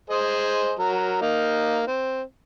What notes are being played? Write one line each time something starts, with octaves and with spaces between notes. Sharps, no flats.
G#4 C5 D#5
F#3 A#4
A#3 D#4
C4